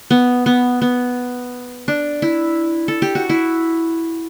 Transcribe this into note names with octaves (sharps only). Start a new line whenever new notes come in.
B3
B3
B3
D4
E4
A4
G4
F#4
E4